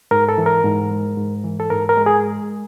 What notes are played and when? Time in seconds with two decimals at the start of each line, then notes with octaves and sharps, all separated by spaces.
0.11 G#2 A#4
0.29 A4
0.38 E3
0.46 A#4
0.64 G#2
0.91 G#3
1.17 G#2
1.44 E3
1.60 A4
1.70 G#2 A#4
1.89 A#4
1.97 G#3
2.06 G#4